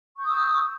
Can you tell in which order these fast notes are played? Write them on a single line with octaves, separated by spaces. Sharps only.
C#6 G6 D#6 E6